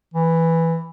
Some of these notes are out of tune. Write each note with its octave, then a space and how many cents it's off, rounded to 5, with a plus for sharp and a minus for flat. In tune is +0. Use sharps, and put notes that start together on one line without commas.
E3 +0